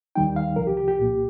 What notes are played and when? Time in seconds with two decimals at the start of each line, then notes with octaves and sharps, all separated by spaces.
0.15 D#2 D#3 G3 D#4 G5
0.36 F5
0.56 C2 C3 F3 A#4
0.67 G4
0.77 G4
0.88 G4
0.98 C2 A#2 A#3